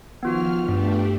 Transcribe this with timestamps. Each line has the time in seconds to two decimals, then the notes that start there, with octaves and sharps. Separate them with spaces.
0.23 D#3 F3 B3 F4 F#4 F6
0.68 G2 A3 D4 G4